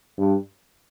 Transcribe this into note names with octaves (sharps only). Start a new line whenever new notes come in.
G2